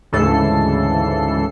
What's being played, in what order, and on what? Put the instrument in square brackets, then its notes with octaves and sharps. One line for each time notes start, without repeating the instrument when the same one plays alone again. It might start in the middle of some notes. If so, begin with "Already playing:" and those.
[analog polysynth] D2 G#2 C#3 E3 A4 C7